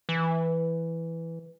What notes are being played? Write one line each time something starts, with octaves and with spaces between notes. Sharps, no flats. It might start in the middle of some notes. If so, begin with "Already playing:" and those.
E3